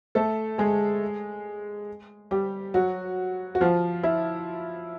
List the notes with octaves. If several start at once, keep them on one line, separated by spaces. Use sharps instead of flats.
A3 A4
G#3 G#4
G3 G4
F#3 F#4
F#4
F3 F4
E4